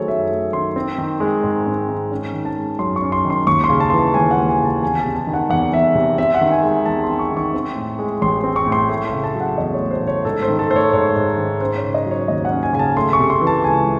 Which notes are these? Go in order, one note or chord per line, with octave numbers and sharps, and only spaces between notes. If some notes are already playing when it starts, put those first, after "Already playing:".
Already playing: D#3 F#3 A3 G#4 A4 C5 C#5
F#2 E5
A3
D#3 C6
C4
D#3
G#3
G#2
C4
D#3
C#4
D#3
A5
G#3
F#2 C6
C#6
C#4
C6
D#3
C6
D#2 C#6
C6
C#3
A5
E3 C6
A5
D#2 G#5
F#5
D#2
G#5
C#3
A5
E2 G#5
C3 A5
A5
D#3
F#5
E2 F#5
E2 E5
C3
C4 E5
F#5
D#3
G#5
G#3
G#5
E2 A5
C4 C6
C#6
D#3
C#6
C4
A2
G#3
A1 C6
C4
C#6
A2
C6
A3 C#6
C#3 C6
A5
F#3
F#5
E2 D#5
C#5
A3
C5
C#3
C#5
G#2 A4
C5
D#3
A4
A3 C5
C#5
G#2 C#5
G#2
D#3
C#4 C5
C#5
C#3
D#5
F#3
C#5
D#2 D#5
F#5
C#4
G#5
C#3 G#5
A5
A3 C6
C#6
C3
C6
E3
A5
C#2 G#5